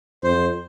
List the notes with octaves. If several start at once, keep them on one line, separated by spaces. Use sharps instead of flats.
F2 C5